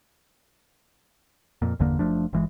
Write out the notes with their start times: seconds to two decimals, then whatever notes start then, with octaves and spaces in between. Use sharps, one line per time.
1.62 F2 A#2
1.79 G1 E2 D3 A#3
1.99 F#1 F3 A3 D4
2.33 G1 E3 G#3